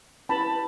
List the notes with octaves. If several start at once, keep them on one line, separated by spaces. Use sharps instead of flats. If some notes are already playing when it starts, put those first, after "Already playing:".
C#4 E4 G4 B4 A5 B5